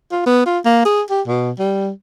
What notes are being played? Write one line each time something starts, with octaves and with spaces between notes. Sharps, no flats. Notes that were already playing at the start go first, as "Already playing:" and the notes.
F4
B3
F4
A#3
G#4
G4
B2
G3